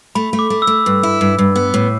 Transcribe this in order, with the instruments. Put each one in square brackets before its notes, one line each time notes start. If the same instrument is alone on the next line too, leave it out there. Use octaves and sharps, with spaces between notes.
[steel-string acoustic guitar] A3 [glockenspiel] B5
[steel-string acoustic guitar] A3
[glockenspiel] D6
[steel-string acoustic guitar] A3
[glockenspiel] E6
[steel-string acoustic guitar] A3
G2
E4
G2
G2
B3
A2